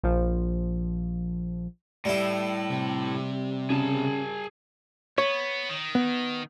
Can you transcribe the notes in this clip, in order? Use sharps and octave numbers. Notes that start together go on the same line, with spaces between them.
A#1 F3
A2 G3 E4
C3
C#3 G#4 A5
B3 C#5
D#3
B3